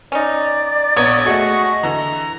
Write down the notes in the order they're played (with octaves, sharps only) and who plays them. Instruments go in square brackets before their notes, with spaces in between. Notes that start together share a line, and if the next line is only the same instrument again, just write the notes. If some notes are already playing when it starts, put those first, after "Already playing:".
[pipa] C#4 D#4 [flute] D5
[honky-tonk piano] A#1 B3 A#5 [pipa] C#5 [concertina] D#6
[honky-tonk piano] A3 G#4 [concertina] F#4 C#6 [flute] D#5
[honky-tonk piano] D3 E3 [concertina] A#5